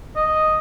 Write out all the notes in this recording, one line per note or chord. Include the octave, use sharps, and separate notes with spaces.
D#5